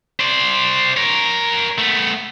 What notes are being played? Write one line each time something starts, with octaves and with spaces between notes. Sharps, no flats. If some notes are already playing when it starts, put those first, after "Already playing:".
C5 D5
A#4 C#5
A3 B3